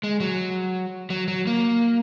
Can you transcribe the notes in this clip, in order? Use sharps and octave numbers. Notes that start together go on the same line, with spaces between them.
G#3
F#3
F#3
F#3
A#3